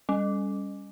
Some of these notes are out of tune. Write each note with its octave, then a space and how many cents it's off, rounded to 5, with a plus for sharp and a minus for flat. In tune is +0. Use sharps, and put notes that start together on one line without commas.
G3 +25 C#4 +10